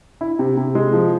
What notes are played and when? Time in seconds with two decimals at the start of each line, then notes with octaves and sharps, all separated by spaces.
0.21 E4
0.39 C3
0.57 C3
0.75 G#3
0.93 F3